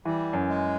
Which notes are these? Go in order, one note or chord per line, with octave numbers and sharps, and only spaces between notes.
E3 G3
F#2
G#3